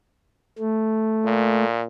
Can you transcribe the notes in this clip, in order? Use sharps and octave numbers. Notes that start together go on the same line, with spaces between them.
A3
A#2